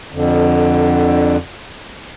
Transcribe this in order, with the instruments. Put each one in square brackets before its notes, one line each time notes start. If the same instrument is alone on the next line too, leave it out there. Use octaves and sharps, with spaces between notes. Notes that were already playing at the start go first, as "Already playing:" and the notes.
[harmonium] F2 D3